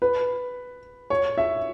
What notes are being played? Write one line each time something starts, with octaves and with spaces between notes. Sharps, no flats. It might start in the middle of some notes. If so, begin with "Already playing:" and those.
B4
C#5
E5